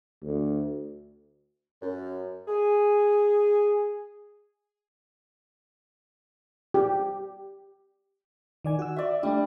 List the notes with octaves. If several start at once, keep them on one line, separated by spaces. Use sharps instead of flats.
D2
F#2
G#4
G4
D#3 D5 G#5
F#4 E6
D5 E5
G3 A3 D4